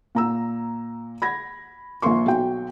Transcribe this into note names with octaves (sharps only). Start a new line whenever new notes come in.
A#2 A#5 E6
B5 G#6 A#6
A#1 A#2 A#3 C6 C#6
B1 F#3 G5